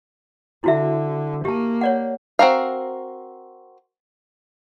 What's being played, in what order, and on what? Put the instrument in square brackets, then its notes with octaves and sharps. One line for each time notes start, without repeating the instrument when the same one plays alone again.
[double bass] D3 [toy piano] E4 F#4 E5
[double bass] A#3 [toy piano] G4 A5
[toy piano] C#5 D5 F#5
[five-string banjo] C4 F#4 A#4 F5